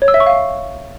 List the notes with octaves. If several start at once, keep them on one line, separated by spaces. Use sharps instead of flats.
C#5
E6
E5
C#6
F5